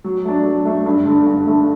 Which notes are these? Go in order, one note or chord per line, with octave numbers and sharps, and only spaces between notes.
F#3
A3 D4
F#3
A3 D4
G2
D3 A3
G2
D3 A3